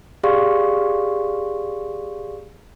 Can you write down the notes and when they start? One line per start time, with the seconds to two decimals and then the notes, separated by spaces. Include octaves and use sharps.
0.24 G4 G#4 D5 F5 C6 C#6